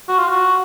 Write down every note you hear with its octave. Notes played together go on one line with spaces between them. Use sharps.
F#4
F4
F#4